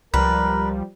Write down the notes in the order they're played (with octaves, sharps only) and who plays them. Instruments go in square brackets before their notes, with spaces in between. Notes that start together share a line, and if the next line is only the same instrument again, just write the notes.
[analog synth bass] C#2 [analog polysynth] F3 G3 [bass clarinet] A#4 [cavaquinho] B4